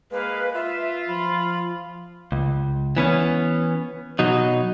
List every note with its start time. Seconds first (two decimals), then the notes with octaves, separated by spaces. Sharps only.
0.11 G#3 A#3 B4 F5
0.55 F4 E5
1.08 F3 B5
2.32 C#2
2.97 E3 B3 C#4
4.19 B2 F#3 D#4